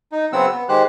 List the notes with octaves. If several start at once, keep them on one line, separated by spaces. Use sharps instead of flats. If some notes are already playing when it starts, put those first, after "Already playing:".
D#4
C#3 F#3 B3 C4 F#5 E6
B3
D#3 G#3 G4 C5 F#6